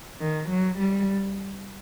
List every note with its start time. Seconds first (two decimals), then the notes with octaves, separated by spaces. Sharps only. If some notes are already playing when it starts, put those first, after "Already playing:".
0.21 D#3
0.49 F#3
0.78 G3